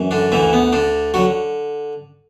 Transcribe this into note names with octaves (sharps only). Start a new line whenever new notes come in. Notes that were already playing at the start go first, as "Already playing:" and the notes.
Already playing: F#2 E3
D3 D4
D2 D3 E3 E4
B3
D3 D4
D3 F#3 F#4